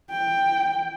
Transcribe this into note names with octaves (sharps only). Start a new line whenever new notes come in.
G5